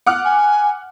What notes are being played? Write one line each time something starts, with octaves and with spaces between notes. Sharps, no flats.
F#5 D6 F6
G#5